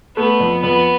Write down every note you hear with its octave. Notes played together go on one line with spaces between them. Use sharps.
A3 B3
F2
F2 B3